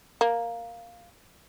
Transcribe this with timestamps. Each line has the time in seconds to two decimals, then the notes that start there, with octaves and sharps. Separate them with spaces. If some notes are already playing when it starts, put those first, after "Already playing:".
0.21 A#3